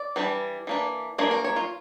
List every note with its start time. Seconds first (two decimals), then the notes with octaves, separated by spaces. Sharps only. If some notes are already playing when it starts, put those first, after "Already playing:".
Already playing: D5
0.16 E3 G3 D4
0.67 E3 A#3 D4
1.18 E3 A#3 D4 C#5
1.31 A#4
1.44 C#5
1.56 F4